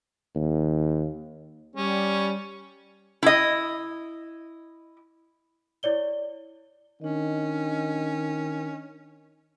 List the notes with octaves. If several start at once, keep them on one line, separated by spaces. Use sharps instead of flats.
D#2
G3 C#4
E4 D#5
E4 C#5 D5 G7
D#3 C#4 D4 D#5